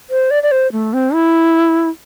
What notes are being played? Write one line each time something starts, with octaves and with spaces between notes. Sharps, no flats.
C5
D5
D5
C5
A3
C4
E4